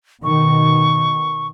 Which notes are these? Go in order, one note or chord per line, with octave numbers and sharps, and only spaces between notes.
B2 D#3 C#6